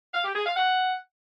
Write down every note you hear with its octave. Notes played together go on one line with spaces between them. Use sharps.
F5
G4
G#4
F5
F#5